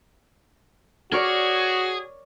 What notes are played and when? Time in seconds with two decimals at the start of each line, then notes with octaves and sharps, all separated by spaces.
1.12 F#4 G#4 A#4 C#5 D5